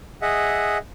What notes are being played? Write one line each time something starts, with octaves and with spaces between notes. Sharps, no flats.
G#4 D#5 E5 F#5